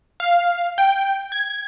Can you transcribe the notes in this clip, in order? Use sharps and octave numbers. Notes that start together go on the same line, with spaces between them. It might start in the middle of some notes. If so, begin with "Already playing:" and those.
F5
G5
G#6